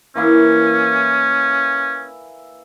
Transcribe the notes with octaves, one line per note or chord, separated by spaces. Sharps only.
E3 A#3 C#4 E4